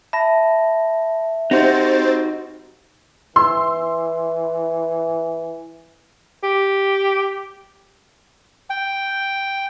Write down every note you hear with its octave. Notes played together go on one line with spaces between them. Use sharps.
E5 A5 B5 A#6
C4 D#4 F#4 G4 C5 G6 A6
E3 C6 E6
G4
G5